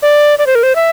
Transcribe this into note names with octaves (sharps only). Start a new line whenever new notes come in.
D5
D5
C5
A#4
C5
E5